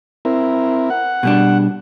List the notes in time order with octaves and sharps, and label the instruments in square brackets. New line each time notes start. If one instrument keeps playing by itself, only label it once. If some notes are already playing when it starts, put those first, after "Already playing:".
[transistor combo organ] C4 E4 A#4
F#5
[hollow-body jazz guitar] B2 G3 D4